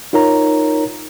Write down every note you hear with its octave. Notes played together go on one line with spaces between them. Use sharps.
D#4 F4 A#4 C#5 A#5